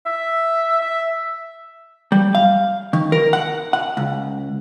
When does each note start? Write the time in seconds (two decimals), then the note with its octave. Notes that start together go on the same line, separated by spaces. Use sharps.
0.06 E5
0.82 E5
2.12 G3
2.35 F5
2.93 D#3
3.12 A#4
3.33 F#5
3.73 F#5
3.97 C#2